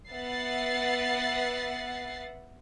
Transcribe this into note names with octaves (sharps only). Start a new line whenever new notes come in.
B3 E5 F#5 A6 C7